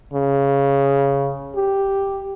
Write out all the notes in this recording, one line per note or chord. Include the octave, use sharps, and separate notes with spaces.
C#3
G4